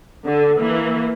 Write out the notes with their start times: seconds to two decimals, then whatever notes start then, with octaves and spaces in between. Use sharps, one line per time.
0.25 D3
0.60 E3 A#3